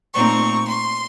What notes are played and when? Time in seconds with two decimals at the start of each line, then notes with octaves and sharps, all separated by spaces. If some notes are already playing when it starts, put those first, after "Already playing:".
0.14 A#2 A3 C4 D#4 C#6
0.69 C6